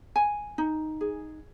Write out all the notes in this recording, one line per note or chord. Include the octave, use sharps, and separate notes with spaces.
G#5
D#4
G#4